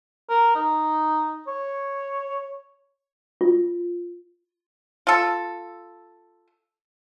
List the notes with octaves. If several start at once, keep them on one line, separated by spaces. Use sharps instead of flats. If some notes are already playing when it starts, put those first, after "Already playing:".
A#4
D#4
C#5
F4
F4 A4